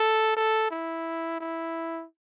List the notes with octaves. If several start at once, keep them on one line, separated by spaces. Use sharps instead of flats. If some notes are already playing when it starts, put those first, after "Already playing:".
Already playing: A4
A4
E4
E4